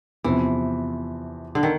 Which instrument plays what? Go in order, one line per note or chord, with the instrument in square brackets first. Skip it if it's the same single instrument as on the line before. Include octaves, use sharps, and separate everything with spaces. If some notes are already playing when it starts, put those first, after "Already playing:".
[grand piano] E2 C3 F3 [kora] E3
[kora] D3
D#3